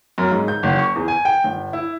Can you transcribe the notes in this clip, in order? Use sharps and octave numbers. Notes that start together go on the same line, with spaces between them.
F#2
G#2
G6
F#1
C#6
E2
G#5
G5
G1
E4